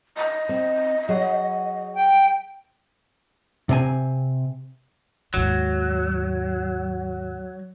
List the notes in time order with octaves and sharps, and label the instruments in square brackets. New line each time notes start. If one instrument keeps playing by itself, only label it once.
[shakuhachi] D#5
[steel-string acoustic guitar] C4
F#3 G#4 F#5
[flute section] G5
[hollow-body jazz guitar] C3 C4 G#5
[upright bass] D#2 G#2 [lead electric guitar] F#3